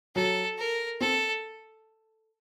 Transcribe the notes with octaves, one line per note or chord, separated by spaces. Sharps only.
F#3 A4
A#4
C4 A4